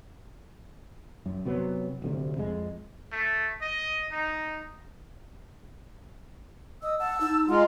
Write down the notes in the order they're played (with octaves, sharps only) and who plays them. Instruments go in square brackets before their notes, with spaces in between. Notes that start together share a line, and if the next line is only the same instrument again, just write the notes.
[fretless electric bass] F#2
C3 F#3 B3
D1 D2 C3
F2 G#3
[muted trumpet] A3
D#5
D#4
[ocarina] D#5 [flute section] D#6 E6
[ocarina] F#5 [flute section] A5 E6
[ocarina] D#4
[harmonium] G#3 F4 [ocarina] F#5 [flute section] A#5